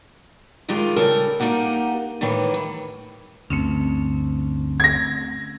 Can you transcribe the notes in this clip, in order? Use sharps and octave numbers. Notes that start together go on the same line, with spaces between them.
D#2 A2 D#3 G#3 F4 G4
C#3 G3 A4 A#4
A#3 C4 D#4 G4 F#5
A2 D#3 E3 G4
E4
G1 D2 A3 C4 C#4
G#6 A#6